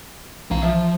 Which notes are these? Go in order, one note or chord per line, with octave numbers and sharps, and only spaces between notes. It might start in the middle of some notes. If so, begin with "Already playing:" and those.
B1 E3 C4 F5 A#5
F3 E5